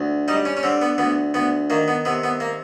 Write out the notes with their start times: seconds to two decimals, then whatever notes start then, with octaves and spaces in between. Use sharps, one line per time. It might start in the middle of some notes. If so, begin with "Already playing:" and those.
Already playing: D2
0.28 G3 D#4
0.45 C#4
0.57 C#4
0.63 D3 C4
0.82 B3
0.98 D2 B3
1.34 D2 B3
1.70 D#3 A#3
1.88 B3
2.05 C3 B3
2.24 B3
2.40 A#3